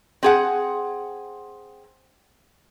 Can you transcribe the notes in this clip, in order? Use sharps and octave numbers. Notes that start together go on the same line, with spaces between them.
C4 G#4 F#5